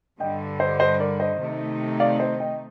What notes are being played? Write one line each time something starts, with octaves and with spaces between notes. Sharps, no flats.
G2 D3 G3 D#5 G5
C5 D#5
C5 D#5
A#4 D5
C5 D#5
C3 D#3 A3 D#4
D5 F5
C5 D#5
D#5 G5